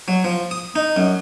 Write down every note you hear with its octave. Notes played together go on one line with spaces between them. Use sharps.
F#3
F3
D#6
D#4
F#2